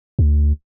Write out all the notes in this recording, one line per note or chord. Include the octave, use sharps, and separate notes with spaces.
D2